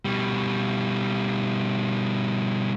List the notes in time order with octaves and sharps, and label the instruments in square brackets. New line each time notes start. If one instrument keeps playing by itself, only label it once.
[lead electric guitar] B2 G3